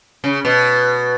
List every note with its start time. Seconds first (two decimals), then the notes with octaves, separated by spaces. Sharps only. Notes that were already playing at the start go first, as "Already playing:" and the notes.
0.24 C#3
0.45 B2